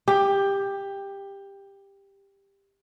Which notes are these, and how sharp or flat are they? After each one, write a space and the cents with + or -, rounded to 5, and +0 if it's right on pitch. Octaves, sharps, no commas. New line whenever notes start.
G4 +15